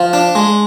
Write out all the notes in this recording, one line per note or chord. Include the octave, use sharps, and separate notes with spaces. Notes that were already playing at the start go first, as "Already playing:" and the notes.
Already playing: F3
D4
G#3